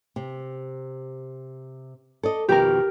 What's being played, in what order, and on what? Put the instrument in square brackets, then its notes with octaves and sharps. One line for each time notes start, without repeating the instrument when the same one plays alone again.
[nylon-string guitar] C3
A4 D5 D#5
[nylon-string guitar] F2 B2 D#3 [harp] G4 A#4